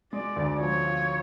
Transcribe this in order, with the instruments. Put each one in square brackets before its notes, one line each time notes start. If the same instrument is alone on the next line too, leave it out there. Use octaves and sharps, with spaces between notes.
[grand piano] G#3 [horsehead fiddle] D5
[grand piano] D2
[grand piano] F3 [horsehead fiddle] C#5
[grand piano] F4